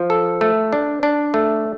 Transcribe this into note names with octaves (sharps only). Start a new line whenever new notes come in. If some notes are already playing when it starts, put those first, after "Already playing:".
Already playing: F3
A4
A3
D4
D4
A3